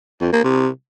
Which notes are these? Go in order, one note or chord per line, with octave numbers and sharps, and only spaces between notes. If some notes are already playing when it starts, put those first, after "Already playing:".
F2
A#3
C3